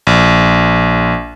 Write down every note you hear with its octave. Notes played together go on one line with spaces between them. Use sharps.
A#1